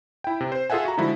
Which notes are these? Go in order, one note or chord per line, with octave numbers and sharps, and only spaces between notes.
E4 G5
C3
C5
F4 G#4 A4 E5 F#5 G#5
F#4 A#5
D3 F3 G#3 E4 F#4